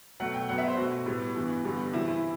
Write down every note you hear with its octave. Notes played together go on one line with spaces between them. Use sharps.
B2 F#3 A3 F#5
G5
F#2 F#3 B3 F#5
E5
C5
B2 A3 F#4
A2 G3 B3
G2 E3 B3
G2 D3 G3 B3
C3 E3 G3 E4
E4